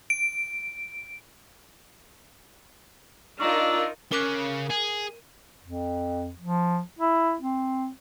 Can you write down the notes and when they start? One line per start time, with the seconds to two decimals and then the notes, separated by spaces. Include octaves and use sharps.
0.10 D7
3.40 D4 D#4 F4 A#4 D#5 A#5 C#6 E6
4.12 C#3 A#4 D6 F#6
4.70 G#4
5.63 F2
6.40 F3
6.99 E4
7.41 C4